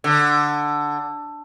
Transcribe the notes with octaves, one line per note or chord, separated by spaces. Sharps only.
D3